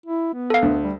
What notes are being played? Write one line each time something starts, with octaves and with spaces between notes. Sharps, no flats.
E4
B3
A4 F5
D2
G3